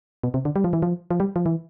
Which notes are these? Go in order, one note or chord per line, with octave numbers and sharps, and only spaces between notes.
B2
C3
D3
G3
F3
E3
F3
F3
G3
F3
E3